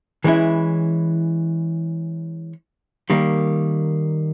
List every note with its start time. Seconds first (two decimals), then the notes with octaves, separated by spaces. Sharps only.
0.24 E3 G#3 C#4 E4
3.10 D#3 G3 A#3